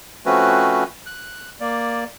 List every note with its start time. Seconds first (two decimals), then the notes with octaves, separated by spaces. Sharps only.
0.26 F3 A3 C4 C#4 F#4 B4
1.06 F#6
1.60 A#3 D5